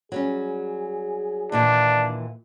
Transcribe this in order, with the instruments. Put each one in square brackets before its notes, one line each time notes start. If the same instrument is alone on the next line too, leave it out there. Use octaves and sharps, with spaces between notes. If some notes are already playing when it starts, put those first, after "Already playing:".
[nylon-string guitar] F#3 G3 C#4 [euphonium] G#4
[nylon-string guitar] D#2 A#2 E3 [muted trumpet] D4